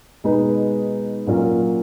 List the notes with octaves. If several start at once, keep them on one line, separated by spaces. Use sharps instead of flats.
B2 G#3 D#4 G#4 B4
A#2 F#3 C#4 F4 A#4